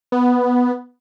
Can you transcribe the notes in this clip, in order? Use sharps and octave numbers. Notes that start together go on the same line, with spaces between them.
B3